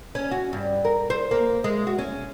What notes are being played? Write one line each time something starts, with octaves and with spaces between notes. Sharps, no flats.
C#4
F#4
G2
A#4
C5
A#3
G#3
F#4
C#4